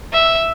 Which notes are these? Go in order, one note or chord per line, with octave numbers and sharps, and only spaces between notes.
E5